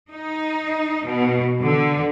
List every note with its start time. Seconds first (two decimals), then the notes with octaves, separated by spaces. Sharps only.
0.11 D#4
1.06 B2
1.62 D3